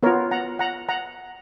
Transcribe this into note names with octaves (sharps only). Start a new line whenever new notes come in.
B3 F4 A#4 C#5
F#5 A#5
F#5 A#5
F#5 A#5